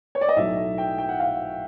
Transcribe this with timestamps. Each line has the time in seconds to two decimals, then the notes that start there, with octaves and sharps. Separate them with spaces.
0.15 C#5
0.21 D5
0.29 D#5
0.36 B1 A2 F#3 A3 E5
0.78 G5
0.98 G5
1.09 F#5
1.20 F5